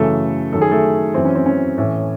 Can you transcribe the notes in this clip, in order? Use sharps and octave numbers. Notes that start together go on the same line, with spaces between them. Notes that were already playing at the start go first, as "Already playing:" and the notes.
Already playing: F#2 C#3 E3 A3 A4
F#2 D#3 A4
G#4
A3 A4
F#2 E3 C4
C#4
C4
C#4
A2 E3